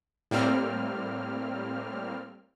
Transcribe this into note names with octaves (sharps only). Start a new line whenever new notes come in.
A2 G3 A#3 C4 F6